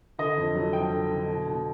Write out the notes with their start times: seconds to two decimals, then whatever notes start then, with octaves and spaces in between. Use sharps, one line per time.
0.18 D3 D#5
0.37 F2
0.55 F#3
0.73 F2 G5
0.92 D3
1.10 D3
1.28 B2
1.47 B2